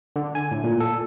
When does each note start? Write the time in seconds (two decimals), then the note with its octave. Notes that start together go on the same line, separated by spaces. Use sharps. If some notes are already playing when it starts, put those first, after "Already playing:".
0.16 D3
0.35 G#5
0.51 A2
0.64 A#2
0.80 A4